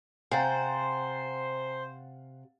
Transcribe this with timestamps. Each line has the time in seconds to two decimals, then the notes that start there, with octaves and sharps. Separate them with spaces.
0.31 C3 C5 F5 F#5 G#5 A#5 A6